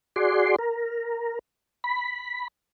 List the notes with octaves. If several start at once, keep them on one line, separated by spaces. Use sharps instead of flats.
F#4 G#4 D5 C6
A#4
B5